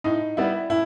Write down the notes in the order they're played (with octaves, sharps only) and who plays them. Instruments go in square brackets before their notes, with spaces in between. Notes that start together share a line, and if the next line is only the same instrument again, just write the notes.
[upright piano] A2 D#4
G3 B3 E4
A2 E4